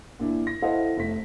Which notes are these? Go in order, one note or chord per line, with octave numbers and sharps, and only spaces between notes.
A#2 D4 E4
A#6
E4 A4 C5 D#5 F5 F#5
F1 A3 B6